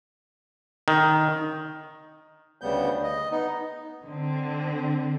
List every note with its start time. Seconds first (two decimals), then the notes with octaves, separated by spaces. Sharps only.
0.88 D#3
2.61 D2 C#3 G3 B3 G6
3.03 D#5
3.32 B3 D#4
4.04 D3 C4